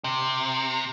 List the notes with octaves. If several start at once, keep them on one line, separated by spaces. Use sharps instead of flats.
C3